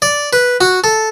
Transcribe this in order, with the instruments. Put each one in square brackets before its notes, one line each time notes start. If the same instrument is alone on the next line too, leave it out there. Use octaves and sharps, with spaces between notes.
[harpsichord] D5
B4
F#4
A4